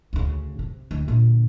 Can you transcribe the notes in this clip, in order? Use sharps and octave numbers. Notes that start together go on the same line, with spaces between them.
D2 C#3
C3
D2
A#2 D3